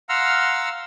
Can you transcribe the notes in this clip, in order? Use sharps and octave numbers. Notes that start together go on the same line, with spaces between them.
F5 F#5 A#5 C6 E6 F6